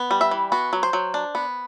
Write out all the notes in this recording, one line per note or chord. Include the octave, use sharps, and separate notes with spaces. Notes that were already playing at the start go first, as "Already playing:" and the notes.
Already playing: B3
G3
E5
E3
B3 F#4
F#3
C5
F#3
D4
B3